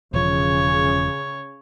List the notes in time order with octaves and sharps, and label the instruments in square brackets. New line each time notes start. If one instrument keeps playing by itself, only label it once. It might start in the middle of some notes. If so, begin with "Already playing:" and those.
[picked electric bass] E1 F3 [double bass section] C#3 [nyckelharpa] C#5